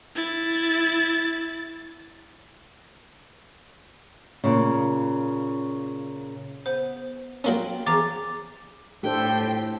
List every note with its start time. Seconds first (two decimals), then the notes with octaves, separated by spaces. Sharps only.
0.15 E4 A6
4.44 A#2 C#3
6.66 B3 C5
7.44 F#3 A#3 C#4 F4 B4 G5
7.86 E2 E3 F3 A#5 D6 A6
9.03 A2 A3 D4 F4 G4 A4 C5 G5